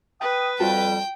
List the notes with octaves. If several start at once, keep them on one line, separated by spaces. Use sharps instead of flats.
B4 G5 D#6
F2 G3 F4 F#4 G5 A5